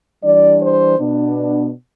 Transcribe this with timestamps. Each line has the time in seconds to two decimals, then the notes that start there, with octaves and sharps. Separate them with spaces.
0.23 E3 G3 D4 D5
0.60 C5
0.98 B2 B3 D4